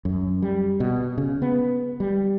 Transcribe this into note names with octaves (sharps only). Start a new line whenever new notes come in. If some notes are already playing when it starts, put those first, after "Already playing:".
F#2
G3
B2
C#3
B3
G3